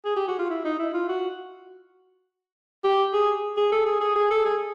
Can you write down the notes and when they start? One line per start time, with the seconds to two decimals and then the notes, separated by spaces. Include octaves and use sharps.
0.05 G#4
0.16 G4
0.28 F#4
0.39 F4
0.50 E4
0.65 D#4
0.79 E4
0.94 F4
1.09 F#4
2.84 G4
3.13 G#4
3.57 G#4
3.72 A4
3.86 G#4
4.01 G#4
4.16 G#4
4.30 A4
4.45 G#4